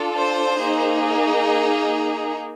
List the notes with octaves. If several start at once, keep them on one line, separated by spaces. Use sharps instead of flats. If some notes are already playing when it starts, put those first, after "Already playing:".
Already playing: D4 F4 A4
C5
A#3 D#4 G#4